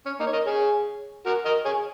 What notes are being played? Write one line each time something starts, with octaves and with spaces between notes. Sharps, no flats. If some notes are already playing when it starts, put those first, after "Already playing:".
C#4
A#3 D#4
C#5
A#4 D#5
G#4 C#5
F#4 A#4
A#4 D#5
G#4 C#5